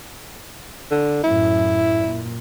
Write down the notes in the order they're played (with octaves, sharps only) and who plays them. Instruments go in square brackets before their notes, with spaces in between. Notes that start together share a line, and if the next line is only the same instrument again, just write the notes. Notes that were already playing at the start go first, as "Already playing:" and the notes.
[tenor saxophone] D3
[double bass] F#2 A2 [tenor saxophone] E4
[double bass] A#2